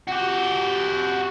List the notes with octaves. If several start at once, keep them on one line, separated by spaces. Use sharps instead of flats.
F#4 G4